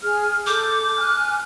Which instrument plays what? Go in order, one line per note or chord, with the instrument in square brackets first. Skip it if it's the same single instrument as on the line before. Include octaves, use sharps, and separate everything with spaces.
[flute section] G#4 F6
[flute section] A4 G6 [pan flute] D6
[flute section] G#5 F6 F#6